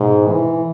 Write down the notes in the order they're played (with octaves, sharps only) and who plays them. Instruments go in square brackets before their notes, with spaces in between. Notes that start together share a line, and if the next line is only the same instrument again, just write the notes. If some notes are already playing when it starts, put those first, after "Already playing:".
Already playing: [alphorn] G#2 [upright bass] B2
[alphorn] E3